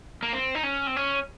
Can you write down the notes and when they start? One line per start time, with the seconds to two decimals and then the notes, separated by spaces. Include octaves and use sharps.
0.23 A#3
0.33 C4
0.55 D#4
0.63 C#4
0.87 C4
0.96 C#4